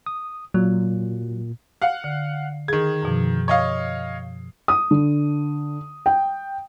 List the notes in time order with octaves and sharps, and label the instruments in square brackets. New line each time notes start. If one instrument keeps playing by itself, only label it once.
[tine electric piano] D#6
[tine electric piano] A#2 [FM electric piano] F#3
[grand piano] F5 F#5
[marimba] D3
[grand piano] D#3 G#6 [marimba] G#4
[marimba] F#2 B2 F3
[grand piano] C#5 D#5 F5
[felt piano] D#6
D3
G5